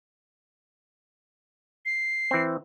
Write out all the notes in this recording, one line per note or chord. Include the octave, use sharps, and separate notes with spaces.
C7
E3 C4